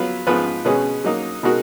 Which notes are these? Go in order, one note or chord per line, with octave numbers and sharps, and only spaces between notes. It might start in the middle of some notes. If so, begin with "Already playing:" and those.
Already playing: F#3 B3 F4 B4
G#2 F3 B3 F4 B4
B2 G#3 C#4 G#4 B4
F#3 A#3 D#4
B2 G#3 D#4 F#4 A#4